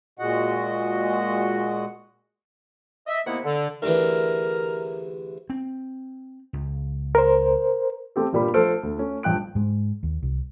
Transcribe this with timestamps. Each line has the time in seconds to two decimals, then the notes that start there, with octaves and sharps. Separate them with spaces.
0.19 A#2 G#3 F#4 D#5 F#5
3.07 D#5 E5
3.26 C3 D#3 A#3 B3 E4 F#5
3.44 D3
3.82 D2 D3 E3 G4 G#4 A#4
5.50 C4
6.53 C#2
7.15 A#4 C5
8.16 A3 C4 G4 A4
8.33 G1 A#2 G3 A#4 B5
8.54 F3 A3 A4 C5 F6 D7
8.83 D2
8.98 A3 C#4
9.23 A#1 G2 G5 F#6 D7
9.55 G#2 G#3
10.03 D#2
10.23 C2